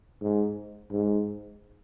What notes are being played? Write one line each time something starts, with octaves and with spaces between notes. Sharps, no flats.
G#2
G#2